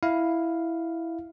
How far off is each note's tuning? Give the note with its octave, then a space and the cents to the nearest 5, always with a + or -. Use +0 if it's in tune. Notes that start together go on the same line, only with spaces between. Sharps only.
E4 +0 F5 +0